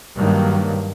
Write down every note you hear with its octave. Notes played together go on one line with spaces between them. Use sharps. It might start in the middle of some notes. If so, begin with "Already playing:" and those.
G2 D#3 F#3 A#3